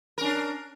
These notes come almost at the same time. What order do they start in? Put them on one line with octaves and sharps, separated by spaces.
A#4 C#4 D4